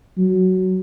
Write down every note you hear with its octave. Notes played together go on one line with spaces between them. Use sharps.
F#3